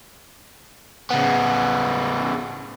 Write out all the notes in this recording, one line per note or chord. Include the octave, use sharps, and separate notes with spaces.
C#3 B3